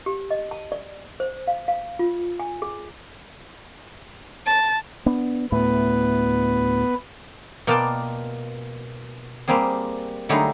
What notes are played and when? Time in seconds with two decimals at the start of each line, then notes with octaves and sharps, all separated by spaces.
0.06 G4
0.31 D#5
0.51 A5
0.72 D5
1.20 C5
1.47 F5
1.68 F5
1.99 F4
2.39 G#5
2.62 G#4
4.45 A5
5.06 B3 D4
5.52 D2 A2 A3 B3 B4
7.67 B2 A#3 F4 D5 G5 A5
9.48 G3 A#3 C4 G#4
10.29 D3 F#3 G3 A3 D#4 G#4